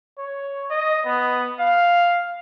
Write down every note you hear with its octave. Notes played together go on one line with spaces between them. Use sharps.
C#5
D#5
B3
F5